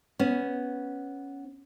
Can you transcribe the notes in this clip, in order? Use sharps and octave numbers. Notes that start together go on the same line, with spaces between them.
B3 C#4